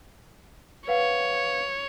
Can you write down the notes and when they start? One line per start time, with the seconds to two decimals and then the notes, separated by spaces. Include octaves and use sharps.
0.88 B4 C#5 F5 F#5